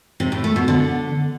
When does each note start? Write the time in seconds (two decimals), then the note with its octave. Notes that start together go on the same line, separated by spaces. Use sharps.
0.20 C3
0.32 A2
0.44 A3
0.56 B2
0.68 D3